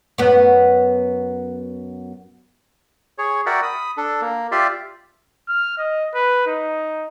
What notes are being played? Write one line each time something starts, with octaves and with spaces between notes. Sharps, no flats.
F#2 B3
G#4 C#5
F#4 A#4 D5 E5 F#5 G5
B5 D#6
D4 A4
A#3
F4 G4 D5 E5 C6
F6
D#5
B4
D#4